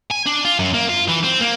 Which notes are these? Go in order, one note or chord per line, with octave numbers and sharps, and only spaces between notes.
G#5
D4
F4
F#2
A#3
F4
E3
C4
A#3